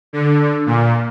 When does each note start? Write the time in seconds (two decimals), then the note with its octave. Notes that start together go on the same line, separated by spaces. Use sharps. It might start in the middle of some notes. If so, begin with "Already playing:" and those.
0.13 D3
0.66 A#2